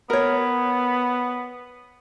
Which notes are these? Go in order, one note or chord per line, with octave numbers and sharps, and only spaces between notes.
B3 A#4 C#5